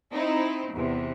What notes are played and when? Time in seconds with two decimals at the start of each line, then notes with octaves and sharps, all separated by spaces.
0.11 C4 D#4 E4
0.72 E2 C3